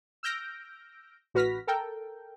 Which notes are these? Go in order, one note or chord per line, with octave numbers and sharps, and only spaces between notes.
E6 F6 G6 A#6 D7
A1 F#4 B4 F6 A#6 B6
A4 A#4 G5